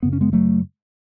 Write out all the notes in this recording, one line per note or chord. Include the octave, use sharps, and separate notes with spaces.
F#2 C#3 B3
C#4
G#3 B3
F#3 A3